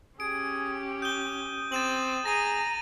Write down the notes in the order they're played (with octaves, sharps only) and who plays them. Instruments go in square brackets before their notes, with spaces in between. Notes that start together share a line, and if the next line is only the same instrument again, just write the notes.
[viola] C#4 G4 [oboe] G#4 [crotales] D7
[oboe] D#6 [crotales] G6 G7
[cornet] C4 [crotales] A6 E7 F#7
[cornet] G#4 [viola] A#5 [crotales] A#6 D#7